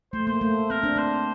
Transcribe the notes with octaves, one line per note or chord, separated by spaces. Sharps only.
A3 C5
A#3 C5
A3
C4 A#4
D4
C4 C5